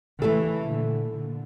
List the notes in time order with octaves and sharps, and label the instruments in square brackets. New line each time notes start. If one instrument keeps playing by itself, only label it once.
[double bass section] C#3 E3 [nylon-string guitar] A3 E4 A4
[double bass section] A#2 D3
A#2 D3